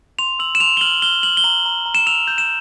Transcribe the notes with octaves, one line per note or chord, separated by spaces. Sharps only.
C6 F7
E6 F#7
E7
C6 F7
G7
F6 F#7
F6 G7
F6 F#7
G7
A#5 F#7
A#5
A#5
E7
E6 F7
G6
E7